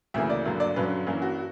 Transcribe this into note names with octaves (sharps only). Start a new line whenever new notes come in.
D2 C#3 E3 A#3 E5
D5
G2 D3 F#3 A#3
D5
G2 D3 F#3 C#4 B4
G2 E3 A#3 C#4
F#4